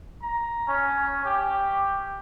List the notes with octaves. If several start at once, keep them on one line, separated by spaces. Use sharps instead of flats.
A#5
C#4
G4